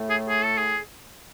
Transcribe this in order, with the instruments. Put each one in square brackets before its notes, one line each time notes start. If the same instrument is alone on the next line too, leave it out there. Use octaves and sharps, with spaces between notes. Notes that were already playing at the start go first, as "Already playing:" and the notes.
Already playing: [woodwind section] A2 A3
[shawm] G#4
G#4
A4
G#4